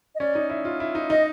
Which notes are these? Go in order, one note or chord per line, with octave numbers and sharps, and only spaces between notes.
D#5
C#4 D5
D#4
E4
F4
E4
D#4
D#4 D#5